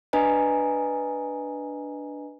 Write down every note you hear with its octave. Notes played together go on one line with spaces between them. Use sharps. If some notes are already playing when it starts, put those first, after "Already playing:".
D4 B4 D#5 G#5 A#5